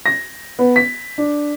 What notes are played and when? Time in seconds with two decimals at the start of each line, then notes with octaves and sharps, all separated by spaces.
0.06 A#6
0.59 B3
0.76 B6
1.18 D4